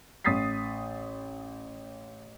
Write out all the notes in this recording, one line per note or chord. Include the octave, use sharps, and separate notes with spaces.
A1 D#6 A6 B6 C7